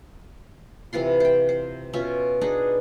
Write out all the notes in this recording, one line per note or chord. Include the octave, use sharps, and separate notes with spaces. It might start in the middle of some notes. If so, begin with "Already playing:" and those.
C3 E3 F4 C6
C5 G5
C5
B2 C#4 F4 E5
B3 D4 D#4 G#4